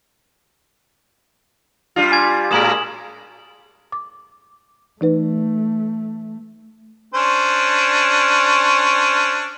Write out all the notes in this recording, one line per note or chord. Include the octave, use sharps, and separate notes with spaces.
G3 D4 F4
G#5 D6 G#6
A2 G#3 A#3 D#6 E7 F#7
D6
E3 A3 D#4 B4
C#4 D4 C5